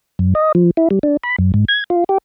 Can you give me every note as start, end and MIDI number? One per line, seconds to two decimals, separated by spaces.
0.19 0.34 42
0.35 0.52 75
0.55 0.71 53
0.77 0.88 64
0.90 0.99 55
1.03 1.17 62
1.24 1.36 83
1.39 1.52 42
1.54 1.65 44
1.68 1.84 92
1.90 2.04 65
2.09 2.18 67